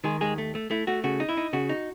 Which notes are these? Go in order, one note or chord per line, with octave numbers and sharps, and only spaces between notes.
D#3 G#3 G#4
D#2 G#3 G#4
A3
A3
A3 E4
A3 F#4
C#3 F#4
D#4
E4
D#4
C#3 F#4
D#4